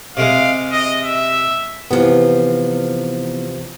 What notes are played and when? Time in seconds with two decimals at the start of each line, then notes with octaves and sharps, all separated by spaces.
0.17 C3 G#3 F5
0.72 D#5
1.03 E5
1.91 C3 E3 F3 B3